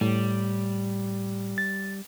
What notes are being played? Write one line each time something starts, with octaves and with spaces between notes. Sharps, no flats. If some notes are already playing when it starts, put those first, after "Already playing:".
A2 G3
A6